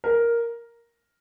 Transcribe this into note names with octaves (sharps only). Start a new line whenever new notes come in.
A#4